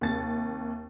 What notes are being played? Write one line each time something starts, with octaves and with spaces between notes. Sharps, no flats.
D#2 C3 A6